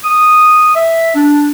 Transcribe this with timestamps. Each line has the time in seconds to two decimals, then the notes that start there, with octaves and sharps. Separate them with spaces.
0.04 D#6
0.75 E5
1.15 D4